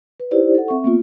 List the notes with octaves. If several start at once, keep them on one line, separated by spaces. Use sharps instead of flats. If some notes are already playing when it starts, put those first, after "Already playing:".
B4
D#4 E4 G4 C5 D5
A4 F#5
C4 E5 C#6
A#3 B3 F4